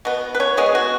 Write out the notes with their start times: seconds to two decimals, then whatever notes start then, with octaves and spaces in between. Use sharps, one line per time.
0.05 B2 B3
0.35 B4
0.40 C#4 C#5
0.57 B2 G#3 B3 G#4
0.75 F#4